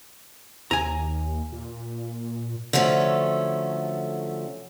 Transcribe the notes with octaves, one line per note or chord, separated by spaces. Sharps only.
D#2 G#5 A#5
A#2
D3 F3 F#3 A3 C#4